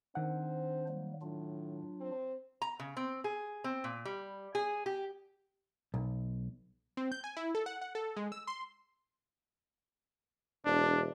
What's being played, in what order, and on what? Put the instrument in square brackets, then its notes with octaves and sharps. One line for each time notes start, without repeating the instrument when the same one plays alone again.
[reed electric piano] D#3 F#5 [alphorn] C4 [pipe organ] D4 C5
[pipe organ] F#3 G3 A#3
[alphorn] A2 [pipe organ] F#3 D4 F4
[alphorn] C4
[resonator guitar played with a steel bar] A#5
C#3
C4
G#4
C4
A#2
G3
G#4
G4
[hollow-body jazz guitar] B1
[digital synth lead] C4
G6
G#5
E4
A4
F#5
F#5
A4
G#3
E6
C6
[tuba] E1 [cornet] D4